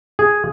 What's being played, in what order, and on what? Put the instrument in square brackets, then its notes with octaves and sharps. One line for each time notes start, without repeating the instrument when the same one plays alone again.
[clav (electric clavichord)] G#4